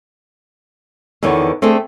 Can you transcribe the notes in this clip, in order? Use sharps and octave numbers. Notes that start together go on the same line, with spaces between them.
E2 D3 D#3 B3 C#5
A3 C4 D4 G#4 A4